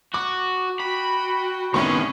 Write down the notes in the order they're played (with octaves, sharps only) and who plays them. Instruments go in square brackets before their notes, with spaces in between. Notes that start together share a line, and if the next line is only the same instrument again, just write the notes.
[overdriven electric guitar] F#4 [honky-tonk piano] D6
[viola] F#4 G5 [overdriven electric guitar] B5
[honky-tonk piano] C2 A2 C#6 [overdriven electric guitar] D#3 B3 [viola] C#4